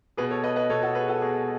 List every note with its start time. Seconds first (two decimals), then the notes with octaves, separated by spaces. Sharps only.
0.17 B2 G#4 B4
0.30 A4 C#5
0.44 B4 D#5
0.56 B4 D#5
0.70 B2 A4 C#5
0.83 F#4 A4
0.95 G#4 B4
1.08 F#4 A4
1.22 B2 G#4